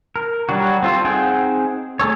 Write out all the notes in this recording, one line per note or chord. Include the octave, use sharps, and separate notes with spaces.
A#4
F#3 G3 D4 F#4
C4 F4 A4
C4 D#4 G#4 F#5 G5
A3 G#4 A4 C#5